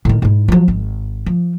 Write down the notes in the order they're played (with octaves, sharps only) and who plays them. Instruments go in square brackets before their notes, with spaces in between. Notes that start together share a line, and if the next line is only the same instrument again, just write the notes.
[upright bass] A2 D#3
G#2 E4
F3 F#3
G#1
F3